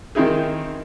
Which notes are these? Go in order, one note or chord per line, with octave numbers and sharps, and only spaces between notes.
D#3 C4 D#4 E4 G#4